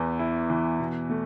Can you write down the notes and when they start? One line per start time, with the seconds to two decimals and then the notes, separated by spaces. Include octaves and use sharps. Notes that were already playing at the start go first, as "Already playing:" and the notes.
Already playing: E2 E3 B3 E4
0.19 E4
0.50 E3
0.79 B2
1.10 A3